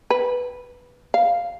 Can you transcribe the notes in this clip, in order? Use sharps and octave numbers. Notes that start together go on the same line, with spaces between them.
B4
F5